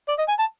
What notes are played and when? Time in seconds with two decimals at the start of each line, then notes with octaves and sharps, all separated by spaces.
0.08 D5
0.18 D#5
0.28 G#5
0.39 A5